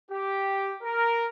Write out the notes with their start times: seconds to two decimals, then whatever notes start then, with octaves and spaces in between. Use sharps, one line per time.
0.10 G4
0.82 A#4